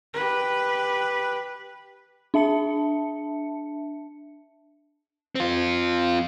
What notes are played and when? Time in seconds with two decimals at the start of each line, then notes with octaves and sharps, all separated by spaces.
0.14 G4 B4
2.34 D4 E5 A5 C#7
5.35 C4 F4